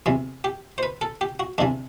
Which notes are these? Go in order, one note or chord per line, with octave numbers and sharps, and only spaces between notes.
E2 C3 E3
G4
C5
B4
A4
G4
F#4
E2 C3 E3 D4